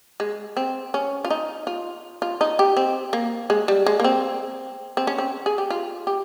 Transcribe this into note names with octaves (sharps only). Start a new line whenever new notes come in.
G#3
C4
C#4
F4
D#4
F4
F4
D#4
G4
C4
A#3
G#3
G3
G#3
A#3
C4
C4
C#4
C4
G#4
G4
F4
G4